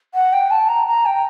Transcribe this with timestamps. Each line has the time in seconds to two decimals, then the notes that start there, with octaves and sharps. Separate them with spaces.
0.15 F#5
0.33 G5
0.51 A5
0.69 A#5
0.87 A#5
1.06 G5